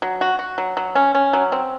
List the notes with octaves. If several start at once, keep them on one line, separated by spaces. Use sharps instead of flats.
F#3
F#4
F#4
F#3
F#3
C#4
C#4
F#3
C4